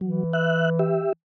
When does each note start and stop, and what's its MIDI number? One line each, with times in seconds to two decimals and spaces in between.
0.01 1.07 52
0.01 0.23 54
0.33 0.70 76
0.33 0.70 90
0.79 1.13 67
0.79 1.13 76